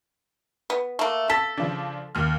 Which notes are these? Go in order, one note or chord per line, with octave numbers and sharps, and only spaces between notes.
B3
A3 A#3
A4 A6 B6
C#3 F3 D4
D#2 F6